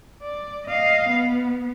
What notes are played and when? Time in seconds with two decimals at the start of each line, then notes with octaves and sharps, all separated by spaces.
0.23 D5
0.68 D#5 F5
1.10 B3